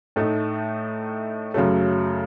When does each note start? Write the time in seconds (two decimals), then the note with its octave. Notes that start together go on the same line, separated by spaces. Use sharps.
0.16 A2 A3 D#4
1.54 F#2 C#3 F#3 A3